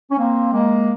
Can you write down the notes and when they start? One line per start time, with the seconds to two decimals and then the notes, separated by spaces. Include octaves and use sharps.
0.10 C#4
0.17 A#3 C4
0.53 G#3 A#3